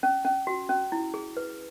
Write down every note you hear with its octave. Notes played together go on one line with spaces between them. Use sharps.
C#4
C#4
F#4
C#4
E4
G#4
B4